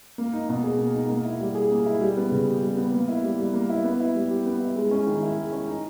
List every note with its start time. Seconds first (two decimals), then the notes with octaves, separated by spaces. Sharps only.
0.18 A#3
0.33 D#4
0.49 B2
0.64 G#4
0.78 A#3
0.95 D#4
1.09 A#3
1.25 E4
1.40 G3
1.55 G#4
1.71 A#3
1.86 E4
2.01 G3
2.17 B3
2.31 C#3
2.48 G4
2.62 G3
2.77 B3
2.92 A#3
3.08 E4
3.23 G3
3.39 G3
3.53 A#3
3.70 E4
3.84 B3
4.00 E4
4.14 G3
4.31 G4
4.46 B3
4.60 E4
4.76 G#3
4.91 C#4
5.07 D#3
5.23 E4
5.37 G#3
5.52 C#4
5.68 D#4